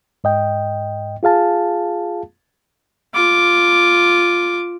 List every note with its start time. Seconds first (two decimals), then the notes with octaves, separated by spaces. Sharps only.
0.24 G#2 D#5 G5
1.23 F4 G#4 F5 A5
3.14 F4 D6